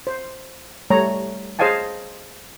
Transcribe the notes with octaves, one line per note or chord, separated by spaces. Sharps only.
C5
G3 A3 C#5 A#5
G#4 C5 D#5 F5 G#5 A5